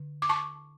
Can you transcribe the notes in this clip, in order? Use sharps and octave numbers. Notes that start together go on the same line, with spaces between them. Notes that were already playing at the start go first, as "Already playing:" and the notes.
Already playing: D3
D6
A5 C#6